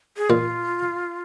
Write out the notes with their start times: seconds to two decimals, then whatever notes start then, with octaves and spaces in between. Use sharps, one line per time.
0.17 G#4
0.30 A#2 F4